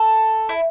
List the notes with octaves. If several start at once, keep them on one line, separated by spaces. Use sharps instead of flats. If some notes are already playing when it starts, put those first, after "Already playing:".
Already playing: A4
E4